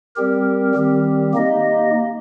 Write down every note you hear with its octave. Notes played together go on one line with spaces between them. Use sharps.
G3 C4 G4 A#4
D#3 G3 C4 G4
A#3 D#4 G4 D#5